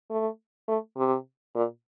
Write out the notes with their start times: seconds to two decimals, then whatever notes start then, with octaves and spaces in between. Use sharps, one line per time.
0.10 A3
0.68 A3
0.97 C3
1.55 A#2